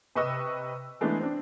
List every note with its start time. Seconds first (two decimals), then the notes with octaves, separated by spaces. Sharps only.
0.16 C3 B4 D#5 C#6 E6
1.01 E3 G#3 A3 B3 D4
1.20 C4 D4